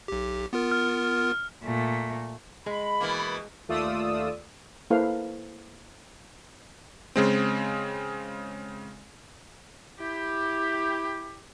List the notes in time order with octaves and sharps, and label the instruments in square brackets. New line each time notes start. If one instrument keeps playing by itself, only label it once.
[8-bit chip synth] B1 G4
B3 F4 A#4
[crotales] F6
[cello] A#2 A3
[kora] G#3 [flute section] B5
[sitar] B2 E3 A#3
[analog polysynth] D#2 A3 F4 D5 D#6 E6
[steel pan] A#3 E4 A4 B4 C5 F5
[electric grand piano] C#3 G#3 C4
[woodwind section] E4 G4